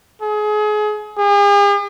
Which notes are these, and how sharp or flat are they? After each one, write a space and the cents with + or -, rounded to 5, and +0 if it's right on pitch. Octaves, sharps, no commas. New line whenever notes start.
G#4 +30
G#4 -45